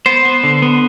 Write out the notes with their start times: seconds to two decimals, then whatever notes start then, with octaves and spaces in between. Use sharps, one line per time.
0.06 B3 C5
0.25 B3
0.44 D3
0.62 B3